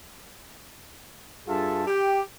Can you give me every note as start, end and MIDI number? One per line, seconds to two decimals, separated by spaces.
1.48 1.82 43
1.48 1.82 65
1.48 1.82 68
1.48 1.82 69
1.48 1.82 76
1.48 1.82 81
1.87 2.23 67
1.87 2.23 79